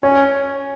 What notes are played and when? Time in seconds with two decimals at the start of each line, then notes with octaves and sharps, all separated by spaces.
0.03 C#4 C#5